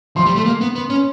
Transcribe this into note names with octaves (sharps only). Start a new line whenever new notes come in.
F3 C6
G3
A3
A#3
B3
B3
C#4